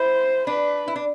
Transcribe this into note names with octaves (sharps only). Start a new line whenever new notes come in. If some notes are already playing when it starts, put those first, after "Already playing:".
Already playing: E4 C5
D4 B4
E4
D4